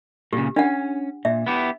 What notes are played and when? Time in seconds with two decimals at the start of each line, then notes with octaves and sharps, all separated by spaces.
0.33 A#2 C#3 G4
0.56 C#4 D4 F#5
1.25 A#2 E5
1.47 B3 E4 G4